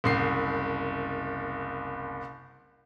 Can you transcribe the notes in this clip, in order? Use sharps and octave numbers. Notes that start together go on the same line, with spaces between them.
F#1 C2 C7